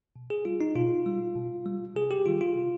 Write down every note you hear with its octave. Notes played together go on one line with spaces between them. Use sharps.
B2
G#4
G3 F4
D#4
B2 F4
G3
B2
G3
C3 G#4
G4
D#3 G3 F4
F4
C3